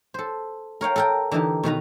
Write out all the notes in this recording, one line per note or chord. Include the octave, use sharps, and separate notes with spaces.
A4 C5
A#4 C#5 F5 G5
A4 A#4 G5
D3 E3 D#4 G4
B2 D#3 B4 A#5